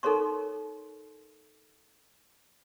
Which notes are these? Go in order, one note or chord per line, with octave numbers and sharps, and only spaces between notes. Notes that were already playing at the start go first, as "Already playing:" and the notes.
D#4 A4 A#4 C#5 C6 C#6